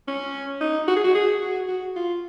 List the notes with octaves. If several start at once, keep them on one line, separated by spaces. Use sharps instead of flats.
C#4
D#4
F#4
G#4
F#4
G#4
F#4
F#4
F4